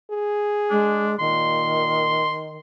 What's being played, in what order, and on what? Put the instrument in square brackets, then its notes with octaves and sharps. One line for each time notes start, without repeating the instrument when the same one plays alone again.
[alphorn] G#4
[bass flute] G#3 [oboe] D4
[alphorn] A#2 [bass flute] D#3 [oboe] C6